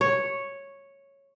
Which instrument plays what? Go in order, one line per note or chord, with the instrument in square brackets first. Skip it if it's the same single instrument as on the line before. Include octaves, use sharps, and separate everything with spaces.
[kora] C#5